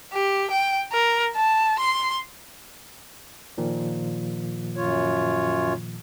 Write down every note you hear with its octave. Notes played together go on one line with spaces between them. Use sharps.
G4
G5
A#4
A5
C6
A#2 D#3 F3
F#2 F4 C#5